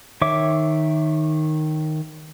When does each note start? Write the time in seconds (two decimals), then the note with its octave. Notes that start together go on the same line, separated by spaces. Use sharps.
0.21 D#3 C#5 E5 D6